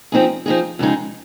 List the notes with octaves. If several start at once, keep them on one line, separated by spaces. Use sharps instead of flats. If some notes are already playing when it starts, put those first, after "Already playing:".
F3 C4 D#4 G#4
F3 C4 D#4 G#4
F2 C#3 G#3 D#4